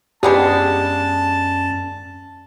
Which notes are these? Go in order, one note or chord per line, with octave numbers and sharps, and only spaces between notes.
F#2 G#3 B3 C#4 D4 G4 A5